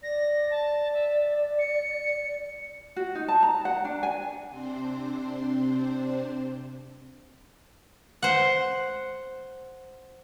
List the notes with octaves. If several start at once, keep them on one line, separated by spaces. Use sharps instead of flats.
D5 A#6
A5
E5
C#7
F#4
D#4
A5
A#5
F#5
D4
G#5
C3 C4 D4 C5
C5 F#5